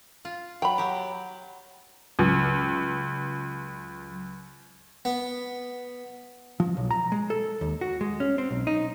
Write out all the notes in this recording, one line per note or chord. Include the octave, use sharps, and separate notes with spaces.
F4
F#3 G5 B5
F#3 G4
C#2 F#3
B3
F3
B1
A#5
G#3
A4
D#2
F#4
G#3
C#4
C4
B1
D#4